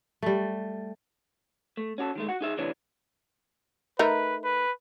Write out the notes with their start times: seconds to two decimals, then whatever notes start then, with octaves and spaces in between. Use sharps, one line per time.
0.22 G3 A3
1.77 A3
1.98 C#4 F#4 G4 A4
2.15 D#3 G#3 A3
2.29 F#4 F#5
2.41 D#4 G#4 E5
2.57 D2 C3 E3 D4 C#5
3.99 A3 D#4 A#4 B4
4.44 B4